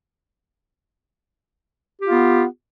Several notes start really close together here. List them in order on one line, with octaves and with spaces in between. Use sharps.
G4 F4 B3